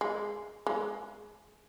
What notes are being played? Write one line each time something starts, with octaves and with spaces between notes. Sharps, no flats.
G#3
G#3